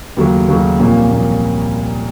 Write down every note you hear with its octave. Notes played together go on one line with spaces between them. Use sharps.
D#2 C#3 F#3 A3
D#2 C#3 F#3 A3
C2 A#2 F3 A#3 C#4
A#2 F3 A#3 C#4